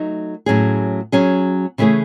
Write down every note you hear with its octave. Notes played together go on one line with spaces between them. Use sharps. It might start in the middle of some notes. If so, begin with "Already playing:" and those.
Already playing: F#3 A3 D#4
A2 F#3 C#4 G#4
F#3 C#4 G#4
C#3 E3 A3 C#4 G#4